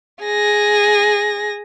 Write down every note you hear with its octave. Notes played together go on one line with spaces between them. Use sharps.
G#4 A#6